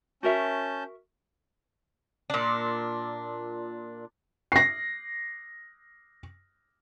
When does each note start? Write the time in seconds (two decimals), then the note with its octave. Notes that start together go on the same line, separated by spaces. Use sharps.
0.23 C#4 F#4 A#4 E5 A5 G6
2.30 A#2 D4
4.52 A#6 C7